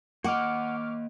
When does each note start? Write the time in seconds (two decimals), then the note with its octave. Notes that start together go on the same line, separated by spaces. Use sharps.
0.24 A#3 D#5 F#5 C#6 D6 F6